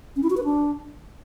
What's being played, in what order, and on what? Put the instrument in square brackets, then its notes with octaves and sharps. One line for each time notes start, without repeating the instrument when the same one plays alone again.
[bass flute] C#4
E4
F#4
B4
D4